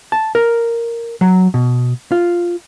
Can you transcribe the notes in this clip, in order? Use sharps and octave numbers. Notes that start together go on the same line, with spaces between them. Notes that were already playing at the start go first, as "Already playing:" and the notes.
A5
A#4
F#3
B2
F4